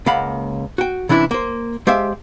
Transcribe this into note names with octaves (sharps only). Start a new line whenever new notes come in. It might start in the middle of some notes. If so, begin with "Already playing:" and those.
C#2 A#3 F5 F#5 B5
F#4 G5
C3 E3 C#4 D4 E4
A#3 C5
G#3 G4 C5 E5 F5 G5